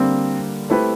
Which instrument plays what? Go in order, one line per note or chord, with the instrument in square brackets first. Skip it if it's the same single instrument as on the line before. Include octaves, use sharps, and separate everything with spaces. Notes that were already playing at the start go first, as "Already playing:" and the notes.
Already playing: [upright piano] D3 G3 A#3 [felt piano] C4
[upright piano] A3 C4 E4 G4 B4